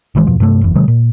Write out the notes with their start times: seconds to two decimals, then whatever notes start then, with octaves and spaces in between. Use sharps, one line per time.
0.15 G#1 D#3 E3 G#3
0.27 F#1 E2 B2 F3
0.40 G2 C3 G3 A3
0.61 F#1 E2
0.75 C3 D#3 F#3 G#3
0.88 A#2